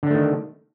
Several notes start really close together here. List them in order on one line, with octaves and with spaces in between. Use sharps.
D3 D4 A3 D#3